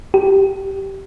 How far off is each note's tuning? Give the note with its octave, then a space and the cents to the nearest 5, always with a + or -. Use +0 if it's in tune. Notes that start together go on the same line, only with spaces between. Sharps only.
G4 -10